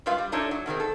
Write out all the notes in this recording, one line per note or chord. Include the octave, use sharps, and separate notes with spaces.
G2 G#3 F4 B4 F5
G3
A3 D4 D#4 F4 A4 C#5
F#3
B2 D#3 G#3 C4
A4